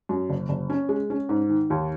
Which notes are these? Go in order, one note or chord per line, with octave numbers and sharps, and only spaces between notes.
F#2
F#1
F#1
C#4
G#3
C#4
G#2
D#3
D#2